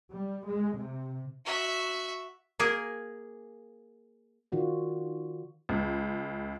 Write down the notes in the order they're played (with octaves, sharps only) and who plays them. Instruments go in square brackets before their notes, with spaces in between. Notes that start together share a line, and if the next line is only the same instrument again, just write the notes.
[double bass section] G3
G#3
C3
[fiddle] F#4 E5
[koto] A#3 G#4 A#4 G#5
[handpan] D#3 F4 F#4 D5
[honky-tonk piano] C#2